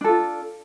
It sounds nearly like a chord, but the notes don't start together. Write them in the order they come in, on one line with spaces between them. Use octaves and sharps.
D4 A4 F4